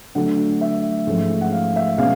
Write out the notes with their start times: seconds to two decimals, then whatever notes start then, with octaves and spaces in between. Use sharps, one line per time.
0.15 D3 F#3 A3 D4 F#5
0.61 E5
1.07 G#2 F3 A3 C#4
1.41 F#5
1.53 F5
1.76 E5
1.98 B2 G#3 C#4 F5